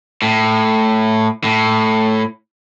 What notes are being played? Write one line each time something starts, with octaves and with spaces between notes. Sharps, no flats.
A2
A2